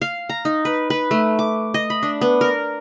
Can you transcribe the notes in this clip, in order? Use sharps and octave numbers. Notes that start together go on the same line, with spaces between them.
F5
A#5
D#4
B4
B4
A3
D6
D#5
B5
D4
B3
A#4